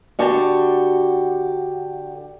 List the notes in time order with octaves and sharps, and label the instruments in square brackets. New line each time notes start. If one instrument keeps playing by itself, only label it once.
[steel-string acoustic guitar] D3 F#4 G4 A5